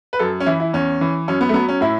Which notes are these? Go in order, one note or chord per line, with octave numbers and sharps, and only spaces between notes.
B4
F#2 A4
C#4
E3 E4
E4
E2 C#4
E3
F#2 C#4
B3
A3
F#3 B3
C#4
A2 E4